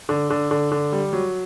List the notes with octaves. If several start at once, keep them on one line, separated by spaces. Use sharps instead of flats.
D3
D3
D3
D3
G3
F#3